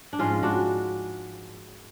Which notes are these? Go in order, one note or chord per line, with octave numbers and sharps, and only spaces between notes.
D4
G#2 F3 G#3 C#4 F4
D4 F#4